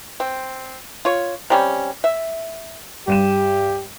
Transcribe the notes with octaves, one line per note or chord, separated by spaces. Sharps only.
C4
F4 C#5
C3 G3 C#4
E5
G2 G4 D#7 E7